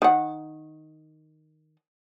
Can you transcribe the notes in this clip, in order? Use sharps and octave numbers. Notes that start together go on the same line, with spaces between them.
D#3 F#5